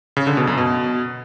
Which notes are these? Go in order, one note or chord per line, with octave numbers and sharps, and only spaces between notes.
C#3
D3
B2
F#2
B2